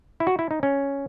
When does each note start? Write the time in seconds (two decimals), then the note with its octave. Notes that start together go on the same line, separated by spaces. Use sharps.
0.20 E4
0.27 F#4
0.39 E4
0.51 D#4
0.63 C#4